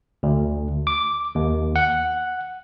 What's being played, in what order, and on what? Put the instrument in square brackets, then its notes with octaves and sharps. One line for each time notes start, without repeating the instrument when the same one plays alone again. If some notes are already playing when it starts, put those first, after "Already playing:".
[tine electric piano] D2
D6
D#2
F#5